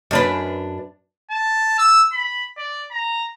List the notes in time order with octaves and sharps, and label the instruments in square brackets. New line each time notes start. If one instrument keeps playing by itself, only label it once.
[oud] F#2 D4 B4
[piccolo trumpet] A5
E6
B5
D5
A#5